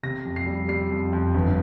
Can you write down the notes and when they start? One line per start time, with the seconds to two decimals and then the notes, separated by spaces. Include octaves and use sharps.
0.03 C3 A#6
0.25 F2
0.36 C7
0.46 G3
0.68 G3 C7
0.91 F2
1.13 F2
1.35 G1